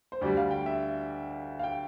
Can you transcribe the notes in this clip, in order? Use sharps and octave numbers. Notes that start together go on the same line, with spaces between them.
C5
D2 D3 G3 D5
F5
G5
E5
F5
G5